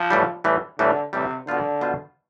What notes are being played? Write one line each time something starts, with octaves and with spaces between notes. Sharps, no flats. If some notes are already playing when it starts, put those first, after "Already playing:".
Already playing: F3
A2 E3 G3
A2 E3 G3
A2 D3 E3 G3
A2 C3 E3 G3
B2 D3 B3 F4 C5
B2 B3 F4 C5